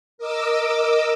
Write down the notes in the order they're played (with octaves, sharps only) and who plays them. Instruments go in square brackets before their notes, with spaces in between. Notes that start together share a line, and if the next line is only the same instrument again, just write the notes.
[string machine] A#4 D#5 D6 E6